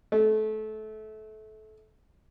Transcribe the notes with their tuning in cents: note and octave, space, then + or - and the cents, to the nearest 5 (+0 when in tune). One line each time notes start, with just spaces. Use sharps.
A3 -25